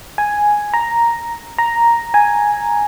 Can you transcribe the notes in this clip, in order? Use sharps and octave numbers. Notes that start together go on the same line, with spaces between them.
G#5
A#5
A#5
G#5